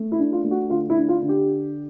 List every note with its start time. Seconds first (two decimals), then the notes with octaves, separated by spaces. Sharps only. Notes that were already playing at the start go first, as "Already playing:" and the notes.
Already playing: A3
0.12 E4
0.19 D4
0.32 F4
0.44 A3
0.51 F#4
0.70 D3 F4
0.90 E4
0.97 D4
1.09 F4
1.22 D3
1.29 G4